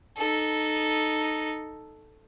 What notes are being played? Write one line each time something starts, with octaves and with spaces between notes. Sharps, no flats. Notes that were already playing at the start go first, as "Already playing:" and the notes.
D#4 A4